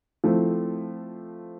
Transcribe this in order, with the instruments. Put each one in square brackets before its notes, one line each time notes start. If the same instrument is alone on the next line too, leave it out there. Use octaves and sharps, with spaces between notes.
[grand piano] F3 A3 C4 E4